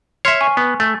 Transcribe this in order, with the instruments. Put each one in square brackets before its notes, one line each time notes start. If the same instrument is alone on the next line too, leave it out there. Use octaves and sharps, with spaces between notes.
[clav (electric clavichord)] C#5 E5 [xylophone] C6 F6 C7
[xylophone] G#5 C#6
[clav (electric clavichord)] B3
A3